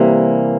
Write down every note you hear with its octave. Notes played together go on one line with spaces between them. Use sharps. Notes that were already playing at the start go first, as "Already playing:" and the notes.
Already playing: C3 E3 G3 A#3